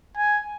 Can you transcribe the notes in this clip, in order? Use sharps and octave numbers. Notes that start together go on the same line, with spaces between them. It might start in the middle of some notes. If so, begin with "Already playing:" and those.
G#5